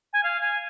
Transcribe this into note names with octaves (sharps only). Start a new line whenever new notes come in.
G#5
F5
G#5